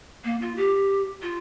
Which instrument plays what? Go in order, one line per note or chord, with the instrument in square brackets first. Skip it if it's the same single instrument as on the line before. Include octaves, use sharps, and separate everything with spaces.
[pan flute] A#3
F4
G4
F4